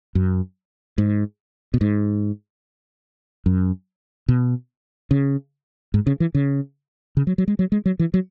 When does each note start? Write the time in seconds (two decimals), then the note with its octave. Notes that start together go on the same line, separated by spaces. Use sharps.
0.15 F#2
0.98 G#2
1.74 B2
1.81 G#2
3.46 F#2
4.28 B2
5.11 C#3
5.94 G#2
6.07 C#3
6.20 E3
6.35 C#3
7.17 C#3
7.27 F#3
7.38 F#3
7.48 G#3
7.59 F#3
7.72 G#3
7.86 F#3
7.99 E3
8.14 F#3